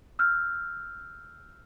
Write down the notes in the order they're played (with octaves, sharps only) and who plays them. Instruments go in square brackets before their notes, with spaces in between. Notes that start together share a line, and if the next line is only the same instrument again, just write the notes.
[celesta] E6 F6 G6